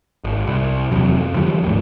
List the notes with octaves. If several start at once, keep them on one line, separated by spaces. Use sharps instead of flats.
G#1
C2
D1 E2 C3 F#3
F2
D3 E3 F3 G3
D1 D2 G#2